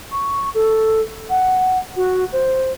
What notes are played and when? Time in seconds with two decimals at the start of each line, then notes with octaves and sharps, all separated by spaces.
0.12 C#6
0.55 A4
1.30 F#5
1.96 F#4
2.33 C5